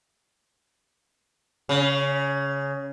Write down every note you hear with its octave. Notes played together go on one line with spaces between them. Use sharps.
C#3